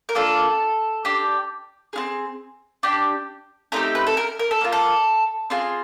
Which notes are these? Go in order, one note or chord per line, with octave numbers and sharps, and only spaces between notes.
A#4
A#3 D4 F4 A4
D4 G4
C4 F4 G#4
D4 G4
A3 C4 D#4 G4 A#4
B4
A4
A#4
A#4
A4
A#3 D4 F4
A4
C4 F4 G#4